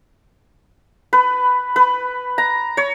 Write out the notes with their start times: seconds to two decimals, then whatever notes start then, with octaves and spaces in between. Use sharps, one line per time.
1.13 B4
1.76 B4
2.38 A#5
2.77 C#5